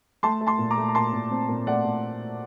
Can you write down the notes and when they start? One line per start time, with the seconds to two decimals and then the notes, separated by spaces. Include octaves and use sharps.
0.23 A3 A5 C6
0.41 A3
0.47 A5 C6
0.59 A#2
0.70 A#5 D6
0.78 A3
0.89 A#5
0.95 A#2 A5 C6
1.13 A#2
1.31 C4
1.49 A#2
1.67 A3 D5 F#5
1.85 A#2